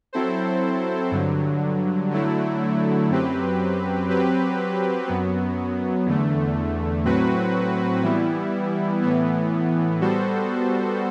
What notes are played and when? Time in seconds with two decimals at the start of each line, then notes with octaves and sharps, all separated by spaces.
0.13 F#3 C4 E4 A4 C5
1.11 G2 D3 F#3
2.11 D3 F#3 A3 E4
3.10 F#2 F#3 C4 G4 B4
4.08 F#3 C4 G4 B4
5.07 F#2 F#3 B3
6.05 E2 D3 A3
7.05 A2 F#3 C4 F#4 B4
8.03 E3 G3 B3 E4
9.02 A2 E3 B3
10.01 G3 B3 F#4 A4 C5